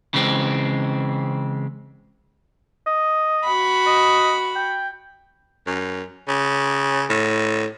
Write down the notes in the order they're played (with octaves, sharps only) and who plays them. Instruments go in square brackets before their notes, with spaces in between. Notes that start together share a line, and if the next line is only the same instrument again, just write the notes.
[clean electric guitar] C#3 E3 G#3 C4
[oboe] D#5
[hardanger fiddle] F#4 B5
[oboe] D#5
G5
[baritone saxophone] F#2
C#3
A2